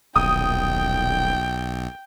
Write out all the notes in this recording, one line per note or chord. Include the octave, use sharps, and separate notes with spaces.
D#1 B1 G5 D#6